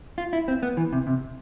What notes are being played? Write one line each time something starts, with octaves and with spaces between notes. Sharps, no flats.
F4
E4
C4
B3
E3
C3
C3